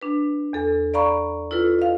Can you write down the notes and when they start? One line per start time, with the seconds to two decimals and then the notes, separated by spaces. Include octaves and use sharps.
0.02 D4 B4
0.53 E2 A4
0.94 D5 F5 A#5 B5 C#6
1.51 E4 F4 A4 B4
1.79 D#5 F5